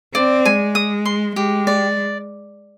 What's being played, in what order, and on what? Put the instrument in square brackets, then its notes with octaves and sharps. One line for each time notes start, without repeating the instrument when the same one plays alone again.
[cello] C4 [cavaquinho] D5
[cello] G#3 [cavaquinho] G#5
[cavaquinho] D#6
C6
[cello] G#3 [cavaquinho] G4
[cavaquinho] D5